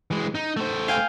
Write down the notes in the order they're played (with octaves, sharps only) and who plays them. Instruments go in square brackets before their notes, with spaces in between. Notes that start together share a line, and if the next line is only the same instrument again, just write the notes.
[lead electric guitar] E3 G#3
D#4
A3 C5
[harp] F5 G5 G#5